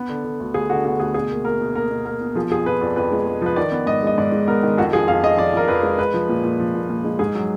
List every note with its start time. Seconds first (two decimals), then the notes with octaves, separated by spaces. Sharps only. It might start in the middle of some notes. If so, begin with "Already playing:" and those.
Already playing: B3
0.09 D3
0.25 D3
0.40 D2
0.54 D2 G#4
0.70 D3 F#4
0.85 B3 F#4
1.00 D2 G#4
1.14 B2 G#4
1.31 A#3
1.45 A#3 A#4
1.61 B2
1.75 A#3 A#4
1.91 B2
2.06 A#3 A#4
2.21 B2
2.35 F3 G#4
2.50 F2 G#4
2.66 F2 B4
2.81 F2 D5
2.96 F2 B4
3.11 G#3
3.27 G#3
3.42 F3 B4
3.56 D#3 D5
3.72 B3
3.86 G#2 D#5
4.03 G#3 D#5
4.18 G#2 D5
4.32 G#3
4.48 B3 A#4
4.63 D#3
4.78 F2 F#4
4.93 F3 G#4
5.08 F2 F5
5.23 F2 D#5
5.38 F2 D5
5.53 F2 A#4
5.68 F2 B4
5.83 G#3
5.98 G#3 B4
6.14 F3
6.29 A#2
6.44 A#2
6.60 F3
6.74 A#2
6.89 A#2
7.04 G#3
7.19 G#2 G#4
7.35 F#3